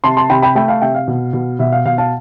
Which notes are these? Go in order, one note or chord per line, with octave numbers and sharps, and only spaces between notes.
C3 A5 C6
A5 C6
C3 G5 B5
G5 B5
A3 G5 B5
F5 A5
C3 E5 G5
F5
B2
B2
B2 E5
F5
B2 F5
F5 A5